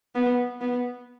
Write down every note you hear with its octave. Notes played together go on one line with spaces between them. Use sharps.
B3
B3